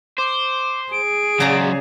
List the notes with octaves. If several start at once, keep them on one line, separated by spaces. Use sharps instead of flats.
C5 D6
G#4 D7
C#3 F#3 G#3 D5 A#5